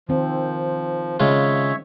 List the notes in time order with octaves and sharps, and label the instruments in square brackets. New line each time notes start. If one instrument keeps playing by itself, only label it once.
[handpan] D#3 C4 [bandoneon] F3
[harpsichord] C#3 G#3 F4 [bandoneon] C#5 E5